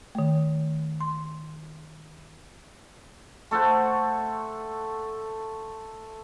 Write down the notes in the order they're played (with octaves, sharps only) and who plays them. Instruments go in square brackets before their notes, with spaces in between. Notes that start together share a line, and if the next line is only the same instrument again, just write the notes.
[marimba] D#3 A3
C6
[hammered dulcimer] A3 A4 C5 F#5